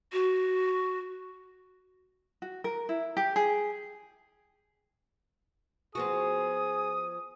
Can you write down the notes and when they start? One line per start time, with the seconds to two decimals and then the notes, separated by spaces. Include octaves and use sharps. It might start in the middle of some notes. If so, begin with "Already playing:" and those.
0.13 F#4
2.42 F#4
2.64 A#4
2.89 E4
3.17 G4
3.36 G#4
5.95 F3 B3 F#4 G#4 D#6